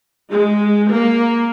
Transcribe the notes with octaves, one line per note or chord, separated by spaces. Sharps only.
G#3
A#3